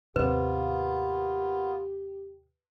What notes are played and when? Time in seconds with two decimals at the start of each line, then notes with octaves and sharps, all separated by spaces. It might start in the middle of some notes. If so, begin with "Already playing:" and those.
0.16 D#2 G#2 C3 A#3 B3 F4 G4 B4